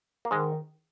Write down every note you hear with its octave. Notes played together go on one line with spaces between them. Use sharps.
A#3
G#2 D#3 G#3